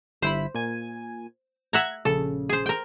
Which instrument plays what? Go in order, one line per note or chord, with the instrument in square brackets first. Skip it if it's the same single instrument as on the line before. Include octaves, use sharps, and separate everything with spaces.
[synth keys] G1 E4 B5 [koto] C5
[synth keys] A#2 G#5
[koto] E5 F#5 A#5 [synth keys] G#6
[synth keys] A#1 C#3 [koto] A4
[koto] G#4 C5
A#4 G5